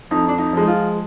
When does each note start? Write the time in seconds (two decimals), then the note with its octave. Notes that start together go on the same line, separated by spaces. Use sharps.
0.11 F2 D#4
0.28 D4
0.38 D#4
0.53 F3 G#3 D#4
0.67 F4